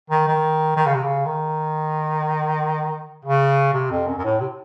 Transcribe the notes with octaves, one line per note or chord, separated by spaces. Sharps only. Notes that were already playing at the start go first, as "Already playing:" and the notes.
D#3
D#3
D#3
C#3
C3
C#3
D#3
C#3
C3
F2
F#2
F#2
A2
C3